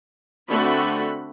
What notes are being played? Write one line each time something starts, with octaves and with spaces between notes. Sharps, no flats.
D3 A3 C4 F#4 B5